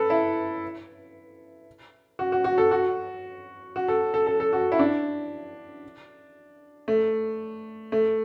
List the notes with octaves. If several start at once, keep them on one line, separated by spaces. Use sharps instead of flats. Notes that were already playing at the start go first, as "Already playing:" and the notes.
Already playing: A4 B4
E4
F#4
F#4
F#4
A4
F#4
F#4
A4
A4
A4
A4
F#4
E4
D4
A3
A3